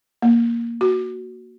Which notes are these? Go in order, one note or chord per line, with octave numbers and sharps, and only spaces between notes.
A#3
F#4